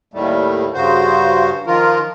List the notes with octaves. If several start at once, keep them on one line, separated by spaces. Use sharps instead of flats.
D#2 A2 D#3 G3 A3
G2 C#3 F#4 C5
D#3 F3 F4 A#4